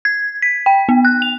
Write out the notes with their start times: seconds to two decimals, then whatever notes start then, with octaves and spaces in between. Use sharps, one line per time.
0.05 G#6
0.42 B6
0.66 G5
0.89 B3
1.05 F#6
1.22 F7